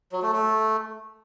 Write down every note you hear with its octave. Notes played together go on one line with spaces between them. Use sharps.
F#3
A3
A3